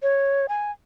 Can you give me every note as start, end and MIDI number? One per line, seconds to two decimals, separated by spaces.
0.02 0.46 73
0.49 0.71 80